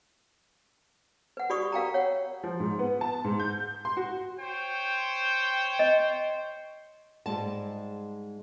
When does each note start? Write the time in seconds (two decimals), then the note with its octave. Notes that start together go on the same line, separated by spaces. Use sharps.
1.37 B4 F#5
1.50 F#4 G4 D5 B5 C#6 D#6
1.72 A#4 F5 G5 A#5
1.94 C#5 F#5
2.43 F3
2.60 G#2
2.79 B3
3.01 A5
3.24 G#2
3.40 G6
3.85 C6
3.97 F#4
4.38 C5 C#5 G5
5.79 D#5
7.26 G#2 G3 G#3 A5